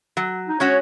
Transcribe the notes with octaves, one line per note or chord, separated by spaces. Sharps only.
F#3
D#4
G#3 C#4 F#4 C#5